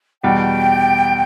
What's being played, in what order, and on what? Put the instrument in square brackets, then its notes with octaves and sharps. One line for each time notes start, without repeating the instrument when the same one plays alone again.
[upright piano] E2 B2 G3 [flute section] G5